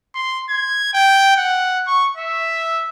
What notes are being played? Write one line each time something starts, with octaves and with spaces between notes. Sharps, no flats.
C6
G#6
G5
F#5
C#6
E5